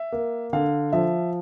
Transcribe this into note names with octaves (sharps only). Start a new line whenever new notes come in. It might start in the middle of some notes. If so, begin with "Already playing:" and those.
Already playing: E5
A#3
D3 F5
F3 E5